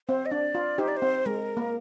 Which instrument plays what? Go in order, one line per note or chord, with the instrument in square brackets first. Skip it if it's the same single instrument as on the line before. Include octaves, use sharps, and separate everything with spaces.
[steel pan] C4 [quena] C5
[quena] D#5
[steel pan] D4 [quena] D5
[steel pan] F4
[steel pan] D#4 G4 [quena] C5
[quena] D5
C5
[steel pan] C4
[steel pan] G#3 [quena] A#4
[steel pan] A#3